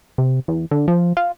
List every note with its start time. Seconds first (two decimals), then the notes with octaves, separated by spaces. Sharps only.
0.18 C3
0.48 E2
0.71 D3
0.88 F3
1.17 F4